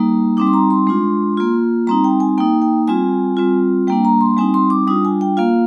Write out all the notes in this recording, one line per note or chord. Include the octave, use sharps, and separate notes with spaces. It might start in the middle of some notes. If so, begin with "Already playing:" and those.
Already playing: G3 A#3 D#4
G3 C4 D#4 D6
C6
A#5
C6
G#3 D4 F4
A#3 F4
G3 C4 D#4 A#5
G5
G#5
A#3 D#4 G5
G5
G3 C4 F4 G#5
G3 C4 F4
G3 A#3 D4 G5
A#5
C6
G3 C4 D#4 G#5
C6
D6
G3 D4 F4 D#6
G#5
G5
A#3 F4 F5